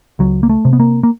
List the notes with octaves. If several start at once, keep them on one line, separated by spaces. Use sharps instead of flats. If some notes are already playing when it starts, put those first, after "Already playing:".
C#2 F#3
A#3
A3
C3
B3
A#3
A#3